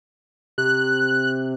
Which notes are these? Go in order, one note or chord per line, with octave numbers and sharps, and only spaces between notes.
C3 F#6